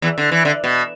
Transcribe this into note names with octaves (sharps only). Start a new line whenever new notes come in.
E2 E3
D3
E3
D3
B2